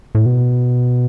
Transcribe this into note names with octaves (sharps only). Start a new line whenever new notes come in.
A2
B2